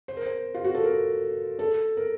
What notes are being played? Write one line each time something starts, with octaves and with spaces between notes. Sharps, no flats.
C5
A#4
C5
F4
F#4
A4
A#4
A4
A#4